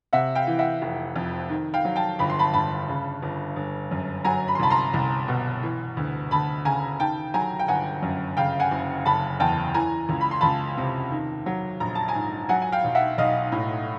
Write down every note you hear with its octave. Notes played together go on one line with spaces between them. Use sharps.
C3 E5 F#5
F5 G5
E3
E5 F#5
F1
F2
D#3
F5 G5
F#3
G5 A5
G1 B5
C6
A5 B5
G2 A5 B5
C#3
G1
G1
F#2
F#3 G#5 A#5
B5
C6
C2 A5 B5
A#5 C6
C2
B2
E3
D2
D2 A5 B5
C#3 G#5 A#5
D#3 G5 A5
F#3 G#5 A#5
G5
G1 F#5 G#5
F#2
C#3 F5 G5
F#5 G#5
F#1
F#1 A5 B5
E2 G5 A5
E3 G#5 A#5
C#2
B5
C6
C#2 A5 B5
C3
D#3
F#3
A#1 A#5
A5
G#5 A#5
G#2
F#3 F#5 G#5
G#5
F5 G5
B1
E5 F#5
B1 D#5 F5
A2